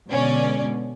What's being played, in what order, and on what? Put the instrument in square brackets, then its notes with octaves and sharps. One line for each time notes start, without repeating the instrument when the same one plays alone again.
[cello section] B2 D3 G#3 [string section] C#4 D5